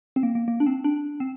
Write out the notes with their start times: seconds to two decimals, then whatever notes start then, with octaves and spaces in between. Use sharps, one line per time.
0.16 C4
0.23 A#3
0.35 A#3
0.48 A#3
0.60 D4
0.66 C4
0.84 D4
1.20 C4